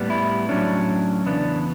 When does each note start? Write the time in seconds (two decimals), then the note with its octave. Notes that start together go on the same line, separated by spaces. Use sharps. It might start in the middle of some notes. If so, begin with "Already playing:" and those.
Already playing: A2 G3 B3
0.10 E4
0.49 A2 F#3 C#4 D4
1.26 E2 C#3 E3 B3 D4